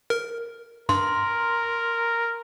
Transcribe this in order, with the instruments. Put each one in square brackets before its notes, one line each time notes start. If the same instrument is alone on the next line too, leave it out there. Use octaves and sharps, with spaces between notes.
[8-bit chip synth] A#4
[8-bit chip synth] G2 [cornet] A#4 [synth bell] C6